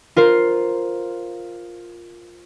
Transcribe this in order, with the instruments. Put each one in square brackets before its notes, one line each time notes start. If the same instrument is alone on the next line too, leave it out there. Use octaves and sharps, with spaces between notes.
[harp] F4 A#4 C5